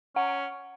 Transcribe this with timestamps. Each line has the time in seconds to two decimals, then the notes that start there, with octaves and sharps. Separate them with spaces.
0.16 C#4 F#5